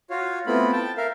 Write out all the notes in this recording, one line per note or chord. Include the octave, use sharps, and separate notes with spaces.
F4 F#4 C#5 F5
A3 B3 C4 E4 F4 B5
G5 A5
A#4 E5 F5